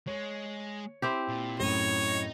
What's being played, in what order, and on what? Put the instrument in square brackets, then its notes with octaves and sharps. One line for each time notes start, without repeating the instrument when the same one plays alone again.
[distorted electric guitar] G#3 [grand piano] C#5
[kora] C4 E4 G4
[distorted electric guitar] A#2
[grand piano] F#2 A2 A3 [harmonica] C#5 [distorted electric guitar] D#5 A#5